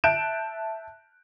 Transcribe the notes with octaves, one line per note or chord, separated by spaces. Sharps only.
E5 A5 F#6 G6 D7 E7